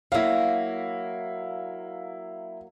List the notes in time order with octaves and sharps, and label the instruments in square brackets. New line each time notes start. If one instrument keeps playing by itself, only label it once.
[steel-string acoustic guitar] F#3 A#3 [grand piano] E4 F5